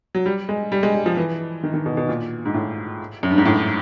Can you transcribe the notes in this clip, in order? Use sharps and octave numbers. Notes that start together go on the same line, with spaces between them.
F#3
G3
G#3
G3
G#3
G3
F3
E3
D#3
D#3
B2
B2
A#2
G#2
A2
F#2
G2
G#2
A2